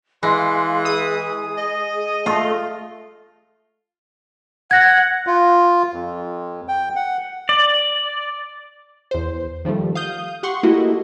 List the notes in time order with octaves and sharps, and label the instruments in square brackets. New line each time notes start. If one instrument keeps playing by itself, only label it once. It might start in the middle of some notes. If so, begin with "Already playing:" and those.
[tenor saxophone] E3 [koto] G#3 [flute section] F5 C6
[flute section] G#4 [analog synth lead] D#6
[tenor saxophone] D#5
[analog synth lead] A3 [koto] F4
[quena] F#5 [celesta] G#6 A#6
[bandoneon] F4
F2
G5
F#5
[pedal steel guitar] D5
[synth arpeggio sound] E2 C5
D#3 F3 G3 A3
F5 D#6 G6
G4 F#5 C6 C#6
A3 A#3 E4 F#4 G4 D#5